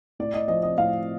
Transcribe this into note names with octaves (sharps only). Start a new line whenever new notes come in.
A2 D5
D#5
F3 D#5
D#5
A2 F5